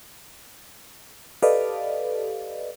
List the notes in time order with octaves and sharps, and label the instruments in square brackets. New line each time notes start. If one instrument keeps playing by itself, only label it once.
[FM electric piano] G4 A4 B4 D5 D#5 F5